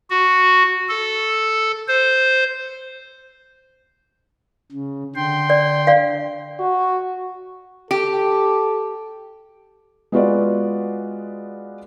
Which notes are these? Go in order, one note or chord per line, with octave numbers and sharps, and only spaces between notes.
F#4
A4
C5
C#3
D3 G5 C6
D5
D5 F5
F#4
G4 A4
G#3 B3 F4 F#4 B4 D5